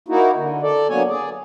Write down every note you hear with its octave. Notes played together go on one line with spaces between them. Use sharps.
A#3 D#4 E4 F#4
D3
A4 D5
D3 F#3 A#3 B3 C#5 G#5
G#4 D5